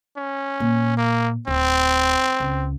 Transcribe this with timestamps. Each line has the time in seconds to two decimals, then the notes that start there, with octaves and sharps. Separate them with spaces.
0.17 C#4
0.60 A#2
0.97 A#3
1.48 D1 C4
2.40 C#2